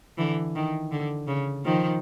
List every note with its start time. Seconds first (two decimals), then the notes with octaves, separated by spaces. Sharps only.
0.18 D3 E3
0.55 D#3
0.91 D3
1.28 C#3
1.65 D#3 F3